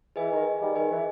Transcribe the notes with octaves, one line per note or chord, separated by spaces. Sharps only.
E3 G#4 B4 D#5 G#5
D#3
D#3 G3
D#3 G#4 B4 D#5 G#5
E3